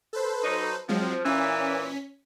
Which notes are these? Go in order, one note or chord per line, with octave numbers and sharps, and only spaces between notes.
A4 B4 C5
F#3 D#4
F3 F#3 G#3 C4
A#2 E3 C#4 B6